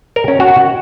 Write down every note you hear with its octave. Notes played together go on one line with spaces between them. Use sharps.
A#4
C#4
F#4